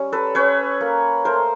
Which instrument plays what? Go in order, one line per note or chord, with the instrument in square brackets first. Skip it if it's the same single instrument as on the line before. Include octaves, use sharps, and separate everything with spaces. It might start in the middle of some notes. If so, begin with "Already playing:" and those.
Already playing: [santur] G3 C#4
A4 B4
C#4 B4 C#5
A#3
A3 A#4 C5